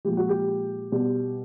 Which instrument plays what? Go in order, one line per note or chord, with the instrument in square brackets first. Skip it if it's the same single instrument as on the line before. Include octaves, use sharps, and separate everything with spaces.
[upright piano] A#2 F3 G#3 G4
F#4
G4
B2 G3